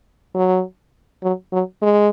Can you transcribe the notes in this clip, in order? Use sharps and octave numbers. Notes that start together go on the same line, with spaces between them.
F#3
F#3
F#3
G#3